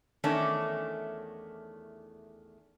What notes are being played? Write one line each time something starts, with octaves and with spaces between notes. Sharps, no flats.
E2 D#3 A3 C#4 D4